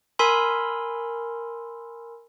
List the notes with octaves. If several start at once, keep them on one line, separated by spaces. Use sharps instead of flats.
A#4 G#5 B5 C6 E6